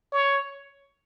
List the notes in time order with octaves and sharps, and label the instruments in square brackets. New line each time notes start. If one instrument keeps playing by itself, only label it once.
[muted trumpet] C#5